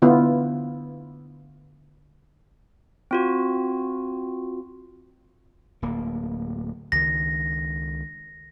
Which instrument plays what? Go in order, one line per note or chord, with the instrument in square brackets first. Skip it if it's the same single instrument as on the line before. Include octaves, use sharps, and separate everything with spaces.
[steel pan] D3 B3 E4 F4
[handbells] C4 F4 F#4
[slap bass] D1 A#3
[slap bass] C#2 D#3 [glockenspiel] A#6